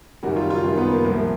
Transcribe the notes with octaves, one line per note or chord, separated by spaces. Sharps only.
F#2 D#3 G3 F#4
F4
F4
F#2 D#3 G3
B3
A#3
C2 A#2 F3 A#3